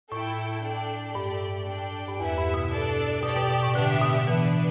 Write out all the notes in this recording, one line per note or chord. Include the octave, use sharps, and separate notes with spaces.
A2 E4 A4 G5
D4 A4 D5 G5
G2 A3 G4 D5
D4 A4 D5 G5
G2
E2 B3 E4 B4 E5
G2
B2
D4 A4 D5
B2 G4 D5 A5
B2
B2
A2
D3 B3 D4 G4 E5
B2
E3 B3 D4 B4